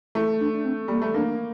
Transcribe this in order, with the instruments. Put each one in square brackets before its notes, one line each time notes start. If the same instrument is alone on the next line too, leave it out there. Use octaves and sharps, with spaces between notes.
[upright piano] A3 [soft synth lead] E4
[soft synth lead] D4
D4
C4
[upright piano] G3 [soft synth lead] A#3
[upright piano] A3
[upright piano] A#3 [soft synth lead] D4